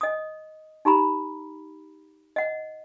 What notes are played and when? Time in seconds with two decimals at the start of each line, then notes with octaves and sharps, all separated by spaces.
0.01 D#5 D#6
0.85 D#4 G4 A#5 B5
2.36 D#5 F#5